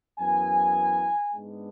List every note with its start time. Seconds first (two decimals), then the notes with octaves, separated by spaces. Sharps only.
0.19 F#2 E3 B3 E4 G#5
1.33 G#2 G#3 B3 D4